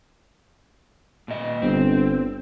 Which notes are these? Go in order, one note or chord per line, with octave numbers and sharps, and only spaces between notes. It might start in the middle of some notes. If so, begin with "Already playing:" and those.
A#2 D#5
G1 C4